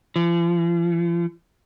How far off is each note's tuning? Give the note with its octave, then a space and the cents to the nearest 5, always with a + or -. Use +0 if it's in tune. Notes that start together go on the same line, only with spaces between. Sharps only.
F3 -40